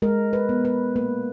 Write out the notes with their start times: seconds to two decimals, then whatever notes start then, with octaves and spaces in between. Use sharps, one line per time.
0.02 G#3 A#4
0.33 B4
0.49 B3
0.65 B4
0.96 A#3 B4